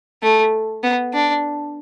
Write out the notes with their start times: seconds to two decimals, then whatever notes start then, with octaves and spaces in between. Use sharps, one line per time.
0.23 A3
0.83 B3
1.13 D4